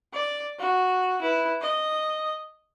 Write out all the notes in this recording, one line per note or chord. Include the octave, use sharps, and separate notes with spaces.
D5
F#4
E4 B4
D#5